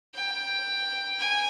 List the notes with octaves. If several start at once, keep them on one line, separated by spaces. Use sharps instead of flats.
G5
G#5